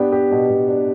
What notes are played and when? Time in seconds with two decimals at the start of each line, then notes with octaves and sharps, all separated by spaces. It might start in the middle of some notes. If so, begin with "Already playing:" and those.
Already playing: B3 D4 G4
0.12 G4
0.31 B2
0.50 B2
0.68 D4